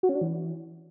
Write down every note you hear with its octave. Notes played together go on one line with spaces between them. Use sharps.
F#4
C#4
D4
E3